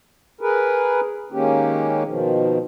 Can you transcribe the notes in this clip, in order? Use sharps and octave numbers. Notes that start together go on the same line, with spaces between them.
G#4 A#4 B4
D#3 G#3 A#3 C#4 G4
B2 D#3 F3